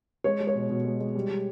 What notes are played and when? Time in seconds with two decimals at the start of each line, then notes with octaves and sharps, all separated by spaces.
0.24 G#3 C#5
0.40 G#3
0.47 C#5
0.55 B2
0.70 B2
0.85 G#3
1.00 G#3
1.15 G3
1.29 G3